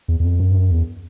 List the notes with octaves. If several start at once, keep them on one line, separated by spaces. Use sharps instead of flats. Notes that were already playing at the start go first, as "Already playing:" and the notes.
E2
E2
F2
F#2
G2
F#2
E2